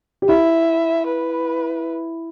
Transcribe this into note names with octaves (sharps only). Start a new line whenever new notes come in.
G4
E4 E5
B4